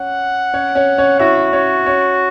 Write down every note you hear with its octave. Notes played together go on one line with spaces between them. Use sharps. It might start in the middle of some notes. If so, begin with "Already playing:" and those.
Already playing: C#4 F#5
C#4 C#5
C#4 C#5
C#4 C#5
E4 F#4 E5
C#4 C#5
C#4 C#5